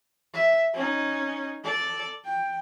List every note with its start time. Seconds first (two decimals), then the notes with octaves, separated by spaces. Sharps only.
0.34 E5
0.74 C#4 D#4
1.64 A4 D5
2.24 G5